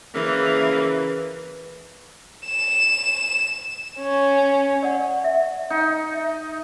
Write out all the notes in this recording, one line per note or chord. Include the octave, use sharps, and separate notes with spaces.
C#3 E3 A#3 B4
E7
C#4
D5 F#5
E5
D#4
E5